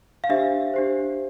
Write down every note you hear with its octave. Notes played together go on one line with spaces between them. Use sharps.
F5
D4 G4 C5 E5
D4 G4 C5